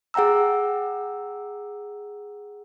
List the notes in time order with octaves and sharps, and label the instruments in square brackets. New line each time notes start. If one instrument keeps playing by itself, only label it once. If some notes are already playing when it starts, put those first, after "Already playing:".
[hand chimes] G#4 F#5 G5 A#5 E6